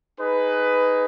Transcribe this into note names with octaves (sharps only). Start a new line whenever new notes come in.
D#4 G#4 B4